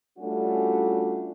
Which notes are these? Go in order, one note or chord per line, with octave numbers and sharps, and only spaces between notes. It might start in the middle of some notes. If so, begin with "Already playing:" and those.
G3 A3 C#4 D4 F4 F#4